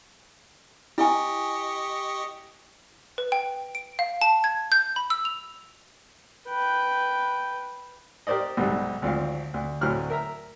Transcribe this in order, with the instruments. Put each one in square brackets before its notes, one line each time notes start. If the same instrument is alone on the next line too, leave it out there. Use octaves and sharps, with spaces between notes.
[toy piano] E4 G#5 [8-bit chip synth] G4 D#5 C#6
[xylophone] B4
G5
D7
F5
A5
G#6
G6
B5
E6
F7
[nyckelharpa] B4 G5
[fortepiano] G4 A#4 C5 D5 D#5
B1 G#2 C3 G3
G#1 D2 F3 F5
D2
D2 A2 F#3 C5 F6 F#6
A#4 E5 A#5